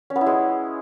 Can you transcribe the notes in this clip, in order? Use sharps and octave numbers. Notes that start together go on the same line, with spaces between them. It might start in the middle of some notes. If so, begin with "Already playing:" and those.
C#4
B3
E4
G#3